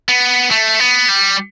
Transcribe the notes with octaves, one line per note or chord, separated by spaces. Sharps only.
B3
A3
B3
G3